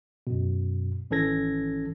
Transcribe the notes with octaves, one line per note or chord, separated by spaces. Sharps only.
F#2 B2
G#1 E3 C#4 A4 G#6 A#6